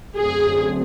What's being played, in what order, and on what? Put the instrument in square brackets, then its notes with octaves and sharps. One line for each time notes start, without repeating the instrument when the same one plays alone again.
[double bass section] F#2 D3 F#3 A3 C4 [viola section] G#4